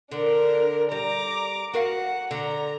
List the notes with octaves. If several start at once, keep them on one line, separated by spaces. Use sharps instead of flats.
D3 D4 A#4
G3 A#5 D6
F#4 A#4 F5 F#5
D3 A#5